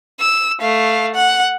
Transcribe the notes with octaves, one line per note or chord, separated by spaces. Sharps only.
E6
A3 F5
F#5